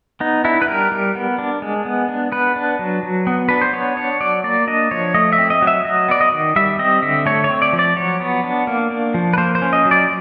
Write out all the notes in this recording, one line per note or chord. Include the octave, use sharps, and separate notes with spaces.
B3 D#4
D4 E4
B4
G3 A#4
G3
B3
D4
G#3
B3
D4
B3 B4
D4
F#3
F#3
B3
D4 B4
C5
B3 C#5
D4 C#5
F#3 D5
A#3 D5
D4 D#5
F3 C#5
A3 D#5
E5
C4
D#5
F#3
E5
F#3 D#5
B3 D5
D#5
D#3
G3 E5
C4 D#5
D3 E5
A3 C#5
C#5
C4
D5
F3
D5
F#3 C#5
B3
D4
A#3
D4
F3
B4
A#3 C5
C5
C#4
D#5
F#3
D5